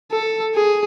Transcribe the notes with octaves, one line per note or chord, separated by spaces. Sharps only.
A4
G#4